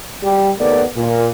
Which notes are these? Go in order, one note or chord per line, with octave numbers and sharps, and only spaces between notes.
G3 G4
D#2 A3 B3 A#4 D5
A#2